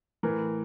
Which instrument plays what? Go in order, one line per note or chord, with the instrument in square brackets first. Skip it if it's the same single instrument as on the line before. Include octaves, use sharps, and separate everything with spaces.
[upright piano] A2 E3 A#4